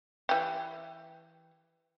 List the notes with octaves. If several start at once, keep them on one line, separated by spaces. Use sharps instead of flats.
E3 G4